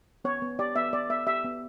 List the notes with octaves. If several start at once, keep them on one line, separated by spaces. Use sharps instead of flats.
B3 C#5
B3
G4 D5
B3 E5
B3 D5
B3 E5
G4 E5
B3